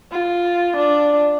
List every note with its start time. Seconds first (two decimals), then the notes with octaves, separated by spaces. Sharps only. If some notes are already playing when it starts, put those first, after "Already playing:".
0.12 F4
0.77 D4